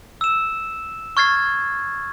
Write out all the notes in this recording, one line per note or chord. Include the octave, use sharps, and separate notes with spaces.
E6 E7
C#6 F6 G#6 A6 C7